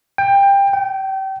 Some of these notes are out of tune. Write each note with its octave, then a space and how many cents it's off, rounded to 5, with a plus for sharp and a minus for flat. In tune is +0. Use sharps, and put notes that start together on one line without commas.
G5 +20
G5 -30